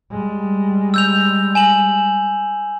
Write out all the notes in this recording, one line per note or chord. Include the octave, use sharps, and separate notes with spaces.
G3 G#3
E6 G6 F7
G#5 E7 F#7